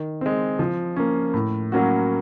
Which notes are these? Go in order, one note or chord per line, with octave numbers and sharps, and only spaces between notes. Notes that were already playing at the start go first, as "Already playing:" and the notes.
Already playing: D#3
G#3 C4
F3
A#3 C#4
A2
F#3 A#3 C#4 F#4